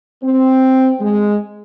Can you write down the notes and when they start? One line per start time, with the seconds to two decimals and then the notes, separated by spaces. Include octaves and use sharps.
0.24 C4
1.01 G#3